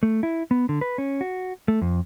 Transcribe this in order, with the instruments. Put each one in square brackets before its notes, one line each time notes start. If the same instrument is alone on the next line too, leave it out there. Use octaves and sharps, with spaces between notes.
[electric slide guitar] A3
E4
B3
D3
B4
C#4
F#4
A3
F2